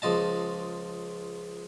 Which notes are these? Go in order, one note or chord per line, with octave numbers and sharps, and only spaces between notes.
C#2 F3 D#5 A5